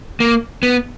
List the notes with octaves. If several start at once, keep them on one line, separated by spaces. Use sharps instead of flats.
A#3
B3